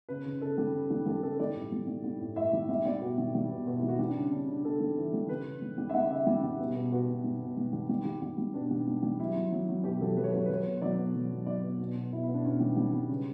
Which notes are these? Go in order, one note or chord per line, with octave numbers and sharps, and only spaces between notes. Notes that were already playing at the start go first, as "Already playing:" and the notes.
C#3 B4
C#3
C#3 A4
G3
C#3
G3
G3 A4
C#3 A4
G3 D5
A2
G3
G3
G3
A2
A2 E5
G3
G3 E5
G3 D5
B2 F#4
G3
G3
B2
B2 F#4
E4
G3
F#4
G3 F#4
D4
C#3
C#4
C#3 D4
C#3 D4
C#3 A4
G3
E3
G3
C#3 B4
C#3
G3
G3
E5
G3 F#5
C#3 E5
G3 G4
G3
B2
B2
B2 F#4
B2
G3
B2
G3
G3
G3
G3
G3
G3
B2 D4
G3
G3
G3
F#3 E4
F#3
F#3
F#3
B2 G4
F#3 A4
F#3 B4
C#5
F#3 B4
C#5
B4
F#3 C#5
B4
B2
F#3 D5
B2
F#3
F#3
F#3 D5
B2
B2
B2
B2 E4
E4
B2
D4
B2 C#4
G3
G3
G3
C#3